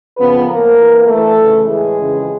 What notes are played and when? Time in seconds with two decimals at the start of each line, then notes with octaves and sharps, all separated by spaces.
0.17 F2 C#3 F3 B3 B4
0.47 A2 F3 A#3 A#4
0.77 G2 E3
1.07 G2 E3 A3 A4
1.37 D2 C#3 E3
1.67 A2 E3 G#3 G#4
1.97 F2 C#3 E3